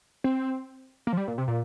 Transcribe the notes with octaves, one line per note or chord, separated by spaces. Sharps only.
C4
A#3
F3
G3
A#2
C3
A#2